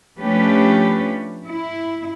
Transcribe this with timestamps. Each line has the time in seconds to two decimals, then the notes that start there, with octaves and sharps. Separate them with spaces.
0.21 F3 A3 C#4 D4 G4 B4
1.47 E4